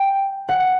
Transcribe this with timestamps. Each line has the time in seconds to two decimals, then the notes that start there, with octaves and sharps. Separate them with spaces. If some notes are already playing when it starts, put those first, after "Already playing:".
Already playing: G5
0.49 F#5